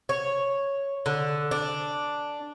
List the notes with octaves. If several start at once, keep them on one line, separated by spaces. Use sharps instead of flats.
C#5
D3
D4